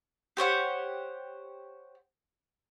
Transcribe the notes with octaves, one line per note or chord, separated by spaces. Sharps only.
G4 C5 C#5 F#5